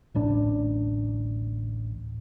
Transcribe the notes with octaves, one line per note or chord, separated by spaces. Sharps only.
D1 A1 D4